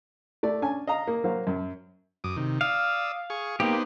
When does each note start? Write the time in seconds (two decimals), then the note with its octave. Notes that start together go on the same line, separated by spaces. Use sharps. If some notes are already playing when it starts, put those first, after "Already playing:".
0.43 A3 D5
0.62 C#4 D4 G#5 A5
0.87 D#5 F5 A#5
1.07 A#3
1.24 F#3 A#3 C5 F5
1.47 F#2
2.24 F#2 D6 D#6
2.37 C3 D#3
2.61 D5 F5 D#6 E6
3.30 G#4 C#6
3.60 A#3 B3 D#4 G4 C5